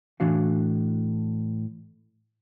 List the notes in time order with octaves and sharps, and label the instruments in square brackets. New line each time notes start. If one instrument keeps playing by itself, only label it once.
[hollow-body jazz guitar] A2 E3 D4 F#4 F5